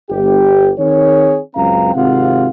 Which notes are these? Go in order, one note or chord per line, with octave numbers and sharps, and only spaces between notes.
G1 G4
D#3 C4 G#4 C#5
C#2 F#2 C4 F5 A#5
G#1 C3 F4 F5 F#5